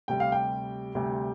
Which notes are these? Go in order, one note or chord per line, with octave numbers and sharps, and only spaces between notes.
D2 C3 G3 G5
F5
G5
D2 C3 G3